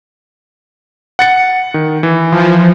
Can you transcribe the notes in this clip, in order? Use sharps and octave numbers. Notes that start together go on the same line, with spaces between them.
F#5 A6 C#7
D#3
E3
F3